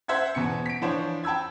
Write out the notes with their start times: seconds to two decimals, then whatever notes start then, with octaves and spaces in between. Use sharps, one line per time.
0.08 C5 E5 F#5 G#6
0.35 E2 B2 C#7
0.66 B6 D7
0.81 E3 F3 D4 C5 C#5
1.24 G5 A5 B5 E6 G#6